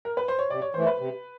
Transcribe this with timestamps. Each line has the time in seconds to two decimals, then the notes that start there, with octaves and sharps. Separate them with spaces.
0.05 A#4
0.17 B4
0.28 C5
0.39 C#5
0.50 C3 D5
0.62 C#5
0.74 E3 A3 C5
0.87 B4
0.99 C3